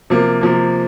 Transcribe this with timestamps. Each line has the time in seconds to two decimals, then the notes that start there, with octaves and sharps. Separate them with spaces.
0.10 C3 F3 A#3
0.41 C3 F3 A#3